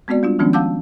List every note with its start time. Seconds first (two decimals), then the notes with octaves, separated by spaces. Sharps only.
0.08 G#3 B3 C4 F#4 D5
0.23 G3 D4 F4
0.39 D#3 F3 G#3 B3 C#4 D4
0.53 F5 F#5 A5 D6 E6 G6